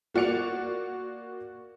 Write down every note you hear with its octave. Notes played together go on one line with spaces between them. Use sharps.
A#3 F#4 D5 C#7 F7